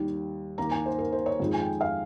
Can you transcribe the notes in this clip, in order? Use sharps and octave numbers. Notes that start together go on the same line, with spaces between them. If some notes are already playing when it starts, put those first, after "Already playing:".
Already playing: D#2 D#3 G3
D#2 D#3 A#3 A#5
G#5
C5
A#4
C5
C#5
F2 D#3 G#3
G#5
G5
F5